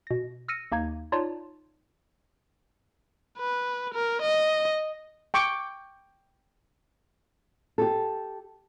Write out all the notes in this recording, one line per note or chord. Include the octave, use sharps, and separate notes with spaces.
B2 A#6
E6 F6 A#6 C#7 D#7
D#2 A#3 D#4 G#6
D#4 F4 C#5 D5 A5
B4
A#4
D#5
G5 C#6 D6
G4 A4